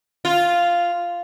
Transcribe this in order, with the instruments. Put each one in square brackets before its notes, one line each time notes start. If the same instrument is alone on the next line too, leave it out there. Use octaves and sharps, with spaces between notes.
[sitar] F4